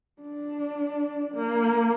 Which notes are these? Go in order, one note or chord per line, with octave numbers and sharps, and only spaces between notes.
D4
A#3